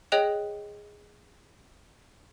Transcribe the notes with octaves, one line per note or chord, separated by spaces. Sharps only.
G#4 C#5 D#5 G5 F#6 F7